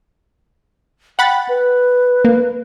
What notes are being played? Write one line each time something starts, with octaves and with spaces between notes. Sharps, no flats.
F#5 G5 B5 A6
B4
A#3